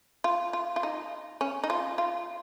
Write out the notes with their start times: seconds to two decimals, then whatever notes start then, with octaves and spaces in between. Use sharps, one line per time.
0.24 F4
0.53 F4
0.76 F4
0.83 D#4
1.41 C#4
1.63 D#4
1.70 F4
1.98 F4